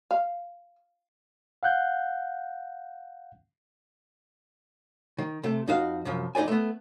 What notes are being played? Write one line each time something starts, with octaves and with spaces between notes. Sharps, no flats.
F5
F5 F#5 F#6 G6
D#3
C3 A3
F2 D#4 F#4 F5
C2 F#2 F3
F2 D#4 C5 D5 G#5
A3 B3